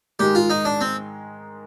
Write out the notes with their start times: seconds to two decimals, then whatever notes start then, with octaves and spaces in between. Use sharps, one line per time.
0.19 G#2 D#3 G#3 G4
0.35 F4
0.50 D#4
0.65 D4
0.81 C4